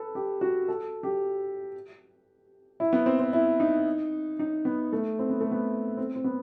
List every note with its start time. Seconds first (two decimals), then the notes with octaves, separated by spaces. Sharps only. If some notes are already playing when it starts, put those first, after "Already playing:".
Already playing: A4 B4
0.15 G4
0.41 F#4
0.68 A4
1.03 G4
2.80 E4
2.93 B3
3.06 C4
3.19 C4
3.33 E4
3.60 D#4
4.39 D#4
4.65 B3
4.93 A3
5.19 C4
5.29 B3
5.40 A3
5.52 B3
5.97 C4
6.16 C4
6.24 B3